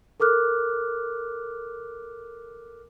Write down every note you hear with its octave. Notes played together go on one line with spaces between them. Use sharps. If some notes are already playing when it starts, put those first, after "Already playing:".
A4 A#4 D6 F6 F#6